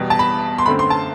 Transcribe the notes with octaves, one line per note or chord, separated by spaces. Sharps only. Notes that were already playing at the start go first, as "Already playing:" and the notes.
Already playing: E2 B2 G3
A5
B5
C6
F#2 D3 A3 C4 B5
C6
A5